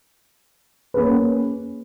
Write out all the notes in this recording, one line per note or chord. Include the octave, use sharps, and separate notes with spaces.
A#3 C#4 G#4 B4